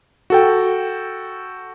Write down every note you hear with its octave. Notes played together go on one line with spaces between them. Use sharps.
F#4 A4 G5